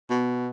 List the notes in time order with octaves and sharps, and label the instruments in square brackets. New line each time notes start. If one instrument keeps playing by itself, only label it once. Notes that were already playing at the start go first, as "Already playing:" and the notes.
[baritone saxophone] B2